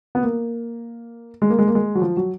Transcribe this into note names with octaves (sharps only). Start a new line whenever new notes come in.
B3
A#3
G#3
A#3
G#3
A#3
G#3
F#3
F3
F#3